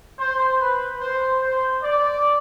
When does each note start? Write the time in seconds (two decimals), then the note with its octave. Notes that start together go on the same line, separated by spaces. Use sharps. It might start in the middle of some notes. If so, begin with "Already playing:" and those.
0.19 C5
0.61 B4
1.01 C5
1.42 C5
1.83 D5